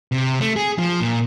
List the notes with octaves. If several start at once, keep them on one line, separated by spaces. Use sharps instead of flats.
C3
A3
G#4
F3
A#2